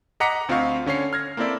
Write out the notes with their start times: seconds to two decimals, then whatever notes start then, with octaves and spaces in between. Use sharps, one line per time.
0.20 D#5 F#5 A#5 D6 B6 C#7
0.49 D2 C4 F4 D#5 F5 C#6
0.86 D3 C#4 C#5 C7
1.13 F6 G#6 A#6
1.37 A#3 C4 E4 A4 D5 E5